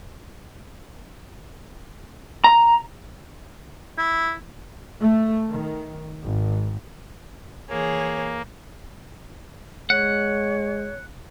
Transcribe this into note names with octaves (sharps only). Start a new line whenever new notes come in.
A#5
E4
A3
D#3
G#1
E3 A#3 G#4 C#5
G#3 C#5 F#5